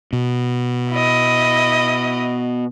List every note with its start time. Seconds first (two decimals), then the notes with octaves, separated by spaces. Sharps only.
0.13 B2
0.91 E4 D#5